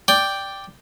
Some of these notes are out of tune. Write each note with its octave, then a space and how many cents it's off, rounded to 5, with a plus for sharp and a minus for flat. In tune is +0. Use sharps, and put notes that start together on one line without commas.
D5 +0 G5 +0